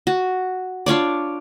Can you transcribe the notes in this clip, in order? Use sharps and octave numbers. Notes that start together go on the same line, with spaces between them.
F#4
D4 F4 C#5 D5